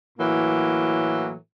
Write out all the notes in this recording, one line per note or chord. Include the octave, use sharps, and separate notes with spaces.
A2 E3 F#3 A#3